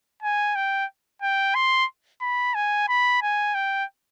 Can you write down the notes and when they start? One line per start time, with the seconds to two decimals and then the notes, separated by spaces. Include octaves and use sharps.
0.22 G#5
0.55 G5
1.22 G5
1.55 C6
2.21 B5
2.54 G#5
2.88 B5
3.22 G#5
3.55 G5